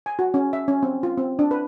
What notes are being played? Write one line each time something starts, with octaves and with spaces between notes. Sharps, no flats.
G#5
F#4
C#4
E5
C#4
C4
F4
C4
D4
B4